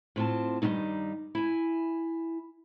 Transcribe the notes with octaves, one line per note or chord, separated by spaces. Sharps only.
A2 C4 F4 A5
G2 D#3 F#3 G3 C4 D#4
E4 G#5